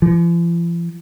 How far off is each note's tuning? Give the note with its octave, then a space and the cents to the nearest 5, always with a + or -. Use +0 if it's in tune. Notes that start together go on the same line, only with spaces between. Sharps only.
F3 -45